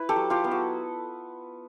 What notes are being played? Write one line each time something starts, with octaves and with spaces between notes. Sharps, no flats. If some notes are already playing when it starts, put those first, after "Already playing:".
Already playing: E4 B4
G4 A4
F#3
F4 G4
B3
F#4